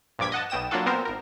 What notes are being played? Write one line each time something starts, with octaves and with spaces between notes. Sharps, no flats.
A#1 G2 F3 D6 G#6 B6
D#5 F#5 A5
B1 B2 G5 D#6 E7
F#3 A#3 D4 F4 F#4 A4
A#2 B3 C4 A#4 C5
G#1 A#4